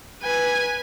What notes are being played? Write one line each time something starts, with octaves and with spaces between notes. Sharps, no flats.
B4 G#5